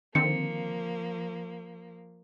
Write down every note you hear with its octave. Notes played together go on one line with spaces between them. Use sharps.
D3 D#3 F3 A#3 C4 C#7